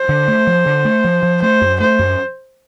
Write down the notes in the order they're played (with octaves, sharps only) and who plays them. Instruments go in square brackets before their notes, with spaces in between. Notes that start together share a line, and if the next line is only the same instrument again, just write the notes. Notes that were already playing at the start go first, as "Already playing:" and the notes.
Already playing: [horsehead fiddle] C5
[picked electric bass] D3
A3
F3
D3
A3
F3
F3
[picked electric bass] A3 [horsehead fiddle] C5
[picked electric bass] F#2
[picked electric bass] A3 [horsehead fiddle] C5
[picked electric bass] F#2